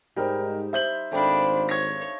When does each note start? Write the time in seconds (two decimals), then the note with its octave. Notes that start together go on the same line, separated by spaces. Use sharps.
0.16 G#2 G3 D#4 A#4 C5 G5
0.73 C5 E5 G6 F#7
1.12 G#1 A3 D4 D#4 C5 F5 G5 B5
1.69 C#5 G#6 A#6